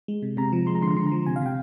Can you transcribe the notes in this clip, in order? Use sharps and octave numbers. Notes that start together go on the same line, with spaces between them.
G#3
C3
C3 A#5
F3
G#3 C6
A#5
D3 C6
D3 C6
A#5
F3
C3 G#5
F5
C3 G5